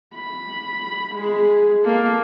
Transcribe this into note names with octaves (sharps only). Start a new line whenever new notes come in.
B5
G#3 G#4
A#3 A4